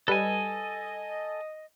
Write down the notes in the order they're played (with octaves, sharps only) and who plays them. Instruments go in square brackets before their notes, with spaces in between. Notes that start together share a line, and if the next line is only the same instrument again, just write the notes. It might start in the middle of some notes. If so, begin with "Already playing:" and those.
[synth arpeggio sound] G3 B4 [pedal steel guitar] A4 G#5 [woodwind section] D#5